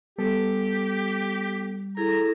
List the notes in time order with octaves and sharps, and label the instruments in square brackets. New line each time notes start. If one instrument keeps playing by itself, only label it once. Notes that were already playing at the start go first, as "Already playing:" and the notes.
[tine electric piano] G3 [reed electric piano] B3 A4 [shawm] G4
[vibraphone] E4 G#4 A4 [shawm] A#5